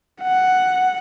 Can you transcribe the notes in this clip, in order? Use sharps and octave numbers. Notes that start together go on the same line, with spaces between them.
F#5